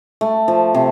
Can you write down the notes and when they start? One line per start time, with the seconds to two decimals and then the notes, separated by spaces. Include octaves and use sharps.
0.21 A3
0.48 F3
0.74 C3